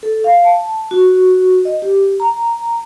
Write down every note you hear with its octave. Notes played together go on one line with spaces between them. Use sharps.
A4
F5
A5
F#4
D#5
G4
A#5